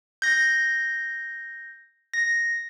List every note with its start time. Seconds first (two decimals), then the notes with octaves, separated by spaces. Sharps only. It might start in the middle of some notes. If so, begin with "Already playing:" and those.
0.22 G6 A#6
2.14 A#6